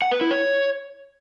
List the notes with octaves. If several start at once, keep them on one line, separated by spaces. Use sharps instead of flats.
F#5
B4
E4
C#5